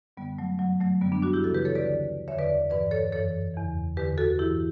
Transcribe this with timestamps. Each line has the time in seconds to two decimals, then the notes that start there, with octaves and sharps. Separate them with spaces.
0.17 F#2 D3 G3 B3
0.38 F#3 A3
0.59 G2 E3 F#3
0.80 F#3 A3
1.01 F#2 D3 G3 B3
1.12 B3 D4
1.22 D4 F#4
1.33 E4 G4
1.44 D2 C#3 E3 F#4 A4
1.54 G4 B4
1.65 A4 C#5
1.75 B4 D5
1.86 D2 D3
2.28 E2 D3 C#5 E5
2.39 B4 D5
2.70 G2 E3 B4 D5
2.91 A4 C#5
3.12 F#2 E3 A4 C#5
3.54 E2 C#3 E3
3.97 E2 G4 B4
4.00 D3
4.18 F#4 A4
4.39 G2 E3 E4 G4